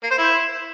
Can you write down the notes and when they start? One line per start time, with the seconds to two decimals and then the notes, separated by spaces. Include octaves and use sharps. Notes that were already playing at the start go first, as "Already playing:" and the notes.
0.03 A#3
0.10 C5
0.18 E4